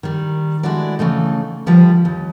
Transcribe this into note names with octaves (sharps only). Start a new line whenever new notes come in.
D#3 G3
G#3 A3 D4 E4 F#4 D5
C#3 E3 A3 D#4
D3 F3 G3 B4
D#2